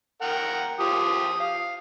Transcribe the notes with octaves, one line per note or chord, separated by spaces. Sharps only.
A#4 F#5 G5
F3 G4 D#6
F5